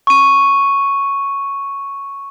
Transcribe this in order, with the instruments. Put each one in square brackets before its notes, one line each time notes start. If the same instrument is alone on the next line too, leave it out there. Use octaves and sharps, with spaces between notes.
[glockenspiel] C#6 D#7